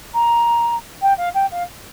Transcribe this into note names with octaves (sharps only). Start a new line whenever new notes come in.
A#5
G5
F5
G5
F5